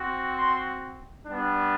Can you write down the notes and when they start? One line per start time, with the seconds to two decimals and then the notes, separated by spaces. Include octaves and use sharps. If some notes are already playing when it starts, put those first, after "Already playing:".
Already playing: C4 F#4
0.38 C6
1.27 G3 B3 D4